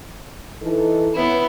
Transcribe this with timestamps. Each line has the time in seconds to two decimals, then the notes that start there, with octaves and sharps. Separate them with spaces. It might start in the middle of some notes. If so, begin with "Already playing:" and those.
0.62 E3 D#4 A4
1.15 B3 C#4 E4 B4